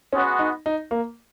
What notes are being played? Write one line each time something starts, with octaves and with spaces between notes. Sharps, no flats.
G#3 B3 C#4 F#4
D#4
D#4
A#3